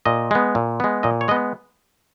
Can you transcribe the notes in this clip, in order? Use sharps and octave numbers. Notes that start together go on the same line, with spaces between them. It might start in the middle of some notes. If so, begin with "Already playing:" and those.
A#2 D#5
G#3 B3
A#2
G#3 B3
A#2 D#5
C#5
G#3 B3 D#5